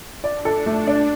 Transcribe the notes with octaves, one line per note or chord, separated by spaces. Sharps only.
D4 D5
A4
A3
D4